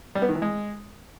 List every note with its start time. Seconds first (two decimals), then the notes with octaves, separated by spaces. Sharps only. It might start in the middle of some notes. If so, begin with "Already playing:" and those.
0.15 G3
0.22 B3
0.29 D#3
0.35 E3
0.42 G#3